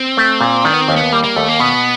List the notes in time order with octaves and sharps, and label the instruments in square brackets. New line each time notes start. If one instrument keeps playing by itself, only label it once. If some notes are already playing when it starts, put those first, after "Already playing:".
Already playing: [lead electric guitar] C4
[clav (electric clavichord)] A3
A#2
[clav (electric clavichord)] D#3 [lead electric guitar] D4
[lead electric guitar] B3
C4
[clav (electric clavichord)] D#2
[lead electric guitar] B3
[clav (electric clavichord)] G3 [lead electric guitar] A#3
[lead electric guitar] A#3
[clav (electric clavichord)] D#2 [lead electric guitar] A3
[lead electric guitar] A#3
[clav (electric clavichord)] B2 [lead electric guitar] B3